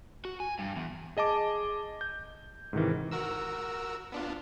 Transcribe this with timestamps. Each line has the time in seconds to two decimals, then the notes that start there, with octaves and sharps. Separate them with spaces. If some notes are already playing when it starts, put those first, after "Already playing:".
0.25 F#4
0.40 G#5
0.59 G2
0.76 E2
1.17 G#4 D#5 A5 D6
2.01 G6
2.73 G#2 C3 D#3 E3
3.11 F#4 A#4 E6
4.12 B3 D4 F4